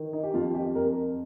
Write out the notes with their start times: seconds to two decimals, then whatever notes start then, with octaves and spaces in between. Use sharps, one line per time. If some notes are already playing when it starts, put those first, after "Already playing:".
Already playing: D#3
0.13 D#4
0.24 G4
0.34 F2 F4
0.55 G4
0.75 F2 A#4